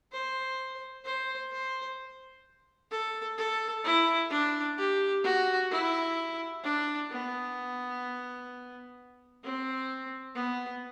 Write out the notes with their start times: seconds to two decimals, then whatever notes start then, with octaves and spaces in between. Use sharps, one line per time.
0.12 C5
1.05 C5
1.52 C5
2.91 A4
3.38 A4
3.84 E4
4.30 D4
4.77 G4
5.24 F#4
5.71 E4
6.64 D4
7.11 B3
9.43 C4
10.36 B3